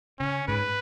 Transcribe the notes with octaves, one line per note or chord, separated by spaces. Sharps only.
C#3 C#4
G#2 B4